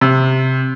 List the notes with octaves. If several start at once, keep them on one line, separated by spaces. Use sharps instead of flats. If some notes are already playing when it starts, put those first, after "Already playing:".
C3